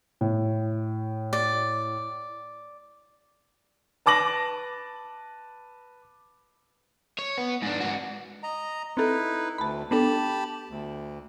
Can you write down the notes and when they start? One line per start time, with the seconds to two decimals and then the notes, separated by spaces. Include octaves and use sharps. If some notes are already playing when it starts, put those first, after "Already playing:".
0.21 A2
1.33 D5
4.06 B4 A5 D6 A#6 F#7
7.19 C#5
7.38 B3
7.62 G#2 D4
7.80 G#2 F#4
8.43 D#5 A#5
8.97 C4 D#4 E4 A4 B4
9.58 D2 A5 B5
9.91 B3 D4 G4 A4 A5 B5
10.69 D2